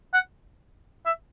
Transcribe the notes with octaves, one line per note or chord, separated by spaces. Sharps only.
F#5
E5